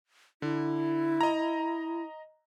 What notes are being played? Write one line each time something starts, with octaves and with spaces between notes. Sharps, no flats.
D3 E4
D#5 A#5